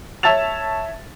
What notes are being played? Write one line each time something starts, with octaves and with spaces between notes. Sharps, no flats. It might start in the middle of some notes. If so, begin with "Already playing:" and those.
C#5 E5 A5 E6 A6 F7